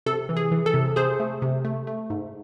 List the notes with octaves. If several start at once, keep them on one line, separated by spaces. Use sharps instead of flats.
C3 A4
E3
G#4
E3
A4
C3
C3 G#4 C5
A3
C3
A3
A3
G#2